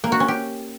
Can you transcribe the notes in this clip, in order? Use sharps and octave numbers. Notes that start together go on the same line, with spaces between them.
A#3
F#4
C#4
G4